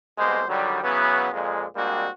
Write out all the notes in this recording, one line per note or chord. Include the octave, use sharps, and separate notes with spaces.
C2 B2 G#3 A#3 B3 C5
D3 D#3 F#3 G3
C#3 E3 F#3 B3
F2 A#2 G#3
G3 G#3 A#3 C4 D4 F#4